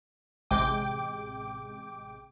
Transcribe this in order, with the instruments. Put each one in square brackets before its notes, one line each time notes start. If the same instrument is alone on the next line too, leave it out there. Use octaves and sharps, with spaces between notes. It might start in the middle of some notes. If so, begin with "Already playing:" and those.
[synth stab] A1 C3 G#3 G5 D6